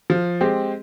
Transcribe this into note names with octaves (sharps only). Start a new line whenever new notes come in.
F3
G#3 C4 G4